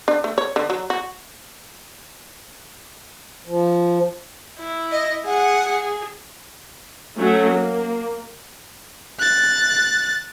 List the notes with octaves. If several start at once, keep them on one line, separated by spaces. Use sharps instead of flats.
D4
A3
C#5
D3
F#3
F#4
F3
E4
D#5
G#4 F#5
G#4
F#3 A3 C#4
A#3
F#6 A6